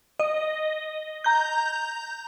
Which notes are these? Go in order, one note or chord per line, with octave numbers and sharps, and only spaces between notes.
D#5
A#5 G6